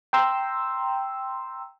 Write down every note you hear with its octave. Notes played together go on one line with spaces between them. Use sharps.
G5 A#5 C6 E6